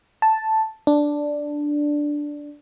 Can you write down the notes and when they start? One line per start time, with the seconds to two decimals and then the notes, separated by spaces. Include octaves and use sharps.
0.22 A5
0.87 D4